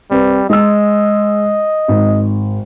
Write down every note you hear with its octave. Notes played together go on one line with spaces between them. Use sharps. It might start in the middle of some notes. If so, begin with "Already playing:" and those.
G3 C4 B4
G#3 D#5 E6
G#1